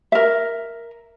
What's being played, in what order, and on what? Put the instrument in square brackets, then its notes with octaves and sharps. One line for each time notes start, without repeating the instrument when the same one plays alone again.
[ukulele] A#4 E5